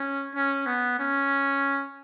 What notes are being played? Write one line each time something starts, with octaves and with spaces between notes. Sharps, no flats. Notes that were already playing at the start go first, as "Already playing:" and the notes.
Already playing: C#4
C#4
B3
C#4